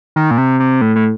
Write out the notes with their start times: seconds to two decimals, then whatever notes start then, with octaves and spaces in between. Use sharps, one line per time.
0.16 D#3
0.31 A#2
0.38 C3
0.60 C3
0.81 A2
0.96 A2